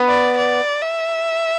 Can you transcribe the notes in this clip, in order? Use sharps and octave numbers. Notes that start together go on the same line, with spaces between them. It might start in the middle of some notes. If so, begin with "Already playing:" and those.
Already playing: B3
D5
D5
E5